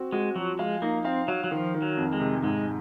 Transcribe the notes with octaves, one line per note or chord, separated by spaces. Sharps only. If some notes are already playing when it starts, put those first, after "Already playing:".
Already playing: C4 F#4
G#3 F#4
F3 F#3
G#3 F5
A#3 D#4
C4 F5
F#3 F5
F#3
D#3 F3
D#3
F#3
F2
G#3
C3
G#2 G#3